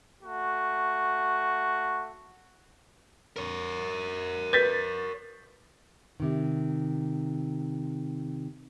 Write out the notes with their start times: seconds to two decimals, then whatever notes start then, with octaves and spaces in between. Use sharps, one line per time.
0.22 A3 F#4
3.36 A#4 C#5
4.53 B4 G6 A6 B6
6.20 C3 D#3